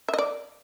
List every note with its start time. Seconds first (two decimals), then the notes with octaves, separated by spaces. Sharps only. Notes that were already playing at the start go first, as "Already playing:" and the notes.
0.08 E5
0.14 D#5
0.19 D5